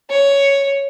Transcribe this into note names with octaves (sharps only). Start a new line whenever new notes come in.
C#5